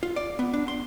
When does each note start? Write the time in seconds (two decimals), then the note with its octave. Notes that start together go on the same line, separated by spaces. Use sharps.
0.03 F4
0.16 D5
0.39 B3
0.53 D4
0.68 C6